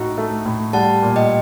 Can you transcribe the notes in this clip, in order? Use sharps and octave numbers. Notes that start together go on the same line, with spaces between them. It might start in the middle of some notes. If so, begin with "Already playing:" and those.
Already playing: A2 D#4 F#4
A3
A2
G3 F#5 A5
A#2
D#5 G5